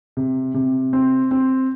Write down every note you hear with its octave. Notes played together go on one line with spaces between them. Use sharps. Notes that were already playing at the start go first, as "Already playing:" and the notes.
C3
C3
C4
C4